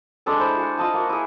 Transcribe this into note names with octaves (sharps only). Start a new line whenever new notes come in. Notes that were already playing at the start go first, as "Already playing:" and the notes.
G#3 D4 A4 B4
E4 C5 B5
F#4 G#5
F4 D#5 A5 E6
A#3 F#4
E4 G#4